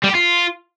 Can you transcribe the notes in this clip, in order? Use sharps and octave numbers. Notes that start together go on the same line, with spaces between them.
G3
G4
F4